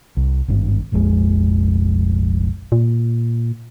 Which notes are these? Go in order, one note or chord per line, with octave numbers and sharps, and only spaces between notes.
C2
G#1 G2
F1 A#1 F2 G#3
A#2